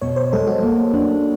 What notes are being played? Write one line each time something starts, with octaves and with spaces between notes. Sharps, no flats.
B2 C#5
C5
G#3 A4
F#4
A#3
D4